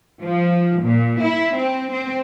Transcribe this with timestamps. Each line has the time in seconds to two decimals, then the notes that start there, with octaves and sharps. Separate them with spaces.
0.22 F3
0.81 A#2
1.20 E4
1.56 C4
1.91 C4